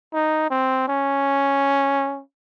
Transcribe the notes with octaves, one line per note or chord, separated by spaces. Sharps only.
D#4
C4
C#4